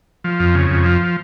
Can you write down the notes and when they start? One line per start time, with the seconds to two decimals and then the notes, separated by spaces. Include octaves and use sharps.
0.24 F3
0.40 F2
0.55 C#3
0.70 F2
0.85 F3